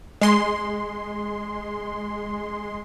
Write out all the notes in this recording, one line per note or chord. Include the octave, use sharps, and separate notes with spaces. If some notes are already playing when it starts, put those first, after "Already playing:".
G#3 C6